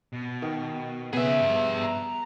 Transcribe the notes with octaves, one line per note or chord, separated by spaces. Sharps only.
B2
D#3
C#3 B3 G#4 E5
G2
A#5